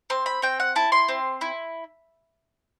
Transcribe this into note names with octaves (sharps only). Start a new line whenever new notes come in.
C4 C6
B5
C4 G5
F#5
E4 A5
C6
C4
E4